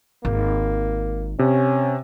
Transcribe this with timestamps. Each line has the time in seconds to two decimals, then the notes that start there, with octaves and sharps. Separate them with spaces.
0.25 G#1 A#3
1.39 C3 C#4